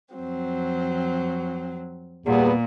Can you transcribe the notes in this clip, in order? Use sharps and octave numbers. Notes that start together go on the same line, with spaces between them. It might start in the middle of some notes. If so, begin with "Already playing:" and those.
F2 F#3 C4
E2 A#2 G3 B3